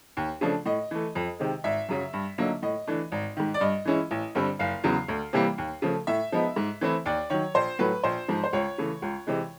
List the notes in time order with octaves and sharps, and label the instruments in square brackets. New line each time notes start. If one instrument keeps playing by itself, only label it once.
[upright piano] D#2
C#3 F3 A3 D4
A2 D#5
E3 A3
F2
C3 D#3 G#3
G#1 E5
F#2 C#3 F#3
G2
D3 F#3 A#3 D#4
A2 D#5
E3 A3 D4
G#1
G#2 D#3
D5
G2 D#5
E3 G#3 C#4 E4
A1
G2 D3 G3 C4
F#1 F5
E2 C#3 F#3 B3
D2
C3 E3 G3 A#3
D#2
C#3 F3 A3
A2 E5
F3 G#3 B3 D#4
G#2
E3 A3 C4 E4
D#2 D5
D#3 F#3 C#5
A#1 C5
A2 F#3 A3 B4
A#1 C5
G#2 F3
C5
C#2 C#5
C#3 E3 A3
C#2
C3 E3 G#3